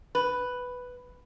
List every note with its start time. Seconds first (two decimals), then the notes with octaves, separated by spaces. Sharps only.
0.15 B4